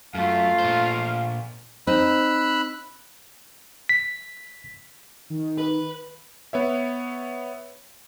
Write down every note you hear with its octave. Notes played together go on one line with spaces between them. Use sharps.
F#2 A3 F4 F5
A#2 C5
C4 D#4 B5 E6 F#6
B6
D#3
B4
B3 C#5 E5